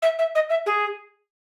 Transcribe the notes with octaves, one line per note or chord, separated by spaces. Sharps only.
E5
E5
D#5
E5
G#4